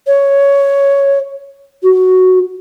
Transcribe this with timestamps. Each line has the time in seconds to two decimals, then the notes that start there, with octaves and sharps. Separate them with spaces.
0.07 C#5
1.83 F#4